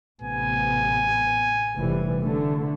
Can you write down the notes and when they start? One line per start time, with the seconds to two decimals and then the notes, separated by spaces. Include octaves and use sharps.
0.22 A1 C3 B3 G#5
1.76 F1 E3 G3
2.22 D3 A3